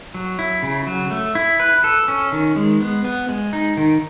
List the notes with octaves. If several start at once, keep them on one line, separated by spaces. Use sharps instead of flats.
F#3
E4
C#3
F#3
A3
E4
B4
A4
C#4
D#3
G#3
B3
B3
G#3
D#4
D#3